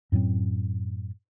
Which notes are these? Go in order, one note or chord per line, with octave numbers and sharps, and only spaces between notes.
F#2 A2 F#3 C4